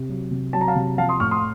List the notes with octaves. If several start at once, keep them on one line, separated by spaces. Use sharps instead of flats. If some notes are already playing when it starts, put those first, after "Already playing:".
Already playing: C3
F#3
C3
F#3 A5
A#5
F5 A5
C3
F3 F5 A5
C6 D#6
A2 C#6 F6
C6 D#6